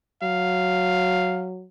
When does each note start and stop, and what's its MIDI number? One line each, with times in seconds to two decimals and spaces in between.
0.22 1.67 54
0.22 1.48 77